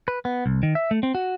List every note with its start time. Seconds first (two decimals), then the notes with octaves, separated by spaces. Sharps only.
0.08 B4
0.25 B3
0.46 C2
0.63 D#3
0.75 E5
0.91 A3
1.03 C4
1.15 F#4